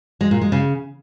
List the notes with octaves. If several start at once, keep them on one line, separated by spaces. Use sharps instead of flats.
G#3
A#2
G#3
C#3